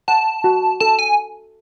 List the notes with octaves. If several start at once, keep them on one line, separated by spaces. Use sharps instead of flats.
F#5 A5
F#4
A4 A5
G#5